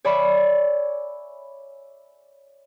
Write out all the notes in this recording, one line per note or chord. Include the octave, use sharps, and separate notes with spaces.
C#5 D5 E5 G#5 B5 C#6